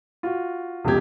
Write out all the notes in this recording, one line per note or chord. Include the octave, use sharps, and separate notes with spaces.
F4 F#4
F1 C#2 B2 G4 G#6